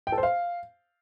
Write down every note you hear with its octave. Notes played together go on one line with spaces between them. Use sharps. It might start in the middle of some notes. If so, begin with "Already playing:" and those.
G5
A4
C5
F5